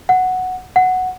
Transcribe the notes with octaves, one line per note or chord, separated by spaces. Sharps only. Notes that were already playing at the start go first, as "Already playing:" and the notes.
F#5
F#5